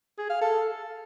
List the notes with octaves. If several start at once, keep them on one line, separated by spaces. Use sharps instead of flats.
G#4
F5
A4